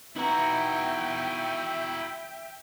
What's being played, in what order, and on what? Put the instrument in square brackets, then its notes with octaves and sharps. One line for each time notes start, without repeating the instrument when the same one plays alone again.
[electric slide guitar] D#4 B4 A#5 [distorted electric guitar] E4 F#4 [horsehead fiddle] E5 G5